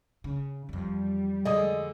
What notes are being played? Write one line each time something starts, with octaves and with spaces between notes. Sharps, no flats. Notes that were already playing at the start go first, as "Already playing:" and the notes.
C#3
F2 E3 G3
D3 G#3 D#5 D#6